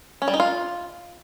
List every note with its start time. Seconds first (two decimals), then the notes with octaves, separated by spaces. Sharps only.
0.22 C#4
0.28 G3
0.34 D#4
0.40 F4